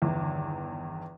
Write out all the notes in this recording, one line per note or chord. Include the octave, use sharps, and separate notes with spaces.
G1 E2 D#3